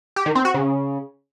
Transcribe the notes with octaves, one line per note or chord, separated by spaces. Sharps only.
G4
D#3
C4
F#4
C#3